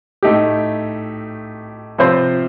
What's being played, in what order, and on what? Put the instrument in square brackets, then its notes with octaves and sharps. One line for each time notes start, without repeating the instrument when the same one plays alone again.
[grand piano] A2 A3 D#4 G4
C3 F3 C4 F4 C5